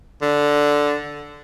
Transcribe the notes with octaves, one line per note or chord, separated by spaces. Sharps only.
D3